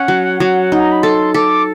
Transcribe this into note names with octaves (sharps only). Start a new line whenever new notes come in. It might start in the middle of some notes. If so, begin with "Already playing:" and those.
Already playing: C#4 F#5
F#3
F#3
D#4
A#5
B5
A4 C6
A4 D6